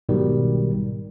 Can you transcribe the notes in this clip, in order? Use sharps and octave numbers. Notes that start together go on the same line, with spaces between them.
B1 G#2 B2 D#3 G3